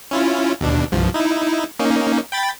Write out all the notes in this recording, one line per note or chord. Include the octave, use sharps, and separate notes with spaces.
C#4 E4 F4
D#2 B2 D4
C2 G2 F3
D#4 E4
A#3 C#4 D#4
G5 B5 A6